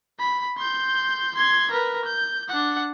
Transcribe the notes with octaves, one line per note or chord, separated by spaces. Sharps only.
B5
C6 G6
C6 G#6
A#4 B4
G6
D4 F#5